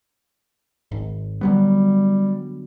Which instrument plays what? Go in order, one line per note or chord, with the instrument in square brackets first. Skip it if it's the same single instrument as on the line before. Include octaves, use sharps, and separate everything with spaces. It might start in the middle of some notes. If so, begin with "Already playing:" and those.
[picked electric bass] G#1
[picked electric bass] D3 F#3 B3 [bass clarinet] G3